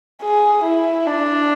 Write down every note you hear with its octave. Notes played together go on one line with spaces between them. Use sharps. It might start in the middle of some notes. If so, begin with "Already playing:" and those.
G#4
E4
D4